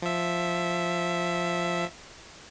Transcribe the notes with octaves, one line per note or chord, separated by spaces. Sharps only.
F3 E5